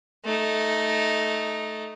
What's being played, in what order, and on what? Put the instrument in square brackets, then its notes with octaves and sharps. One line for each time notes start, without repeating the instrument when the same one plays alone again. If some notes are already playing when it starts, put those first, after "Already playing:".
[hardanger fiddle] A3 D#4